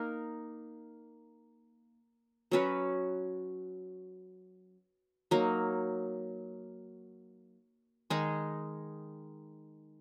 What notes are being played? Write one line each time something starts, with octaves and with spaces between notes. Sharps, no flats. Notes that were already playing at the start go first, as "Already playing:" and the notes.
Already playing: A#3 D#4 A#4
F#3 C#4 F#4 B4
F#3 A#3 D#4
D#3 G#3 D#4 G#4